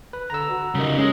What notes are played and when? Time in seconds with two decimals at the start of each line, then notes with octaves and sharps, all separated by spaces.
0.13 B4
0.30 D3 A#5 E6
0.50 F#4
0.75 C#3 G3 D#4 A#4
0.98 G#3 C#4